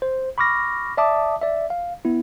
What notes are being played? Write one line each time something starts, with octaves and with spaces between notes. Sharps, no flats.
C5
B5 C#6 D6 F6 A#6
D5 E5 A5 D6 D#6
D5 E5
F5
B3 E4